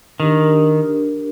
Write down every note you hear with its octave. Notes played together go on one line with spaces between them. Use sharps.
D#3 D4 G4 A#4